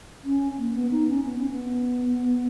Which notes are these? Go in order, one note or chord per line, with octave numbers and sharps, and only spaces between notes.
C#4
A#3
B3
D#4
C#4
B3
C#4
B3